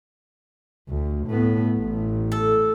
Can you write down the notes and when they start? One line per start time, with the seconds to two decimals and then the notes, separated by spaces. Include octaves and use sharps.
0.89 D2
1.27 A2 B3
1.78 A1
2.32 A4